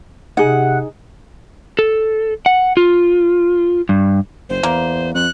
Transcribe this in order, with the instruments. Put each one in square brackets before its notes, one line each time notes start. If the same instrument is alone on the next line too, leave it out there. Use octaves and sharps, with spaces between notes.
[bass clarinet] C3 [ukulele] D#4 G#4 [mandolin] F#5
[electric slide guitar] A4
F#5
F4
G2
[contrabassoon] F#1 [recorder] C5
[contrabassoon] E2 [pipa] A#3
[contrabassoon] F2 [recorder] F#6